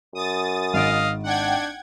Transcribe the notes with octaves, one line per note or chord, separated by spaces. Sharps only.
F#2 D#6 A6
G#1 D#5 F5 D7
D4 F#5 G5 G#6